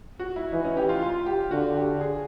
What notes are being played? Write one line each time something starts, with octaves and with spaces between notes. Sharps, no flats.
F#4
E4
E3 D#4
C#4
G4
F4
F4
G4
D3 F#4
G4
G#4